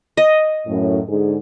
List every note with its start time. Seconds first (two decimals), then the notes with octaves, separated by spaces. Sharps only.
0.17 D#5
0.67 F#2 A2
1.09 G#2 D3 G#4